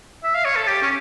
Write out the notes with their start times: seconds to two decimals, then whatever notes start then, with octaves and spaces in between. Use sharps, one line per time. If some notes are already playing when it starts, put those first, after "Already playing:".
0.23 E5
0.35 F5
0.45 C#5
0.56 A4
0.67 G4
0.83 C#4